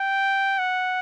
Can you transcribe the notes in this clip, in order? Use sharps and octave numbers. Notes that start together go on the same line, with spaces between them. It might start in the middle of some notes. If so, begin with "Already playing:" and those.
Already playing: G5
F#5